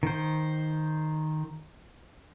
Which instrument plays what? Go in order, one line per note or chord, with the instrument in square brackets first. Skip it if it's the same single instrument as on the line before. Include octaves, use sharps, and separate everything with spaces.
[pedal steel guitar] D#3 C5